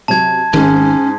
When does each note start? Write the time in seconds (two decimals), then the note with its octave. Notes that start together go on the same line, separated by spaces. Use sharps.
0.08 C3 F#3 A5 G#6
0.53 G#1 G#2 D#3 C#4